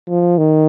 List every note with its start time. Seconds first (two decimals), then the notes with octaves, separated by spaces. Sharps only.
0.08 F3
0.38 D#3